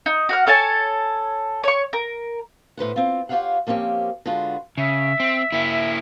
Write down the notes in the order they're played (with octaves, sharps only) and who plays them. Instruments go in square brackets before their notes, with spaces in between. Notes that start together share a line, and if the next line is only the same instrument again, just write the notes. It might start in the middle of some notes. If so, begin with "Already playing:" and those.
[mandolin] D#4
F#4 F#5 F6
A4 C#5 G#5 A5
C#5 C#6
A#4
[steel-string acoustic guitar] A2 B4 C5 F#5
C4 F4
F4 G4 C5 C#5 F5 F#5
F3 A#3 C4 C#4 G4
D3 G#3 F4 F#4 B4
[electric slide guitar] C#3 [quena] E5
[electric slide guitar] C4
A#3 E4